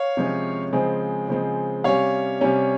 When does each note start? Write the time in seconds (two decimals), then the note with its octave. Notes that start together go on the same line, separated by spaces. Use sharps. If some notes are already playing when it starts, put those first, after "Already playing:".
Already playing: C#5 F5
0.17 C3 F3 G#3 C#4
0.73 C#3 F3 G#3 C4
1.28 C#3 F3 G#3 C4
1.84 C3 G3 C#4 C#5 F5
2.41 C3 G3 C#4